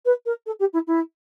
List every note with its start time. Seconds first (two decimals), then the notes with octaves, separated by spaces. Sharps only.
0.05 B4
0.25 A#4
0.46 A4
0.59 G4
0.73 E4
0.87 E4